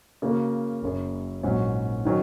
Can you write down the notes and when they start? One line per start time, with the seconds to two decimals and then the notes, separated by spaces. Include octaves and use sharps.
0.22 C#3 A#3 F#4 A#4
0.82 F#1 F#2 C#3
1.43 A#1 G#2 F#3 C#4
2.05 D#3 F#3 C#4